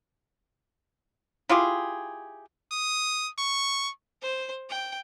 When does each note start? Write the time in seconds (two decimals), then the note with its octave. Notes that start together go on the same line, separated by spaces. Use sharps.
1.49 E4 F4 G4 G#4
2.71 D#6
3.38 C#6
4.22 C5
4.69 G5